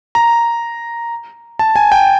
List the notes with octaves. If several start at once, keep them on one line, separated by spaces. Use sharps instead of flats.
A#5
A5
G#5
G5